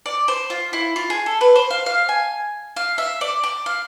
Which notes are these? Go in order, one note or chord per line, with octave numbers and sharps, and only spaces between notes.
D5
C5
F4
E4
F4
G#4
A4
B4
C5
F5
F5
G#5
F5
E5
D5
D5
F5